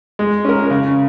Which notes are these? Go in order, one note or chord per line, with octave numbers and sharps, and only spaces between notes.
G#3
C#4 A#4
C#3